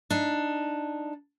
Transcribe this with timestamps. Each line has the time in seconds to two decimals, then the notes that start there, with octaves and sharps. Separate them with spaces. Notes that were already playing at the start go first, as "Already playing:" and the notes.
0.11 D4 D#4